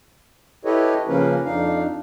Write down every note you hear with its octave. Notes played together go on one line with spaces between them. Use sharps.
E4 G4 A4 B4 C#5 D#5
C#3 F3 A#3 C#4 A#4 B4
F2 D4 D#4 F5